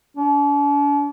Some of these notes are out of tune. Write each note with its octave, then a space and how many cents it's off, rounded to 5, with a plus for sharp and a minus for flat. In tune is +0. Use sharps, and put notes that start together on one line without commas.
D4 -45